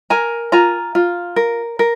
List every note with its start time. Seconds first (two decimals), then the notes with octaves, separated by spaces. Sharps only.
0.10 A#4 G#5 A#5
0.52 F4 G#5 A#5
0.95 F4
1.36 A#4
1.79 A#4